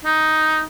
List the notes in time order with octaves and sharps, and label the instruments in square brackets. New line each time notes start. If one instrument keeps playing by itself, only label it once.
[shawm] D#4